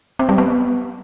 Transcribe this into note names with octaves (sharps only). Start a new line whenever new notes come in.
C4
G3
B3